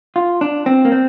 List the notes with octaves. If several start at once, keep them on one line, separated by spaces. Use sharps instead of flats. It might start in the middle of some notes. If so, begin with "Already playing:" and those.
F4
D4
C4
A#3
C4